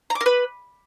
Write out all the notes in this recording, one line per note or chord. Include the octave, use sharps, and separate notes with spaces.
A#5
D6
A#4
B4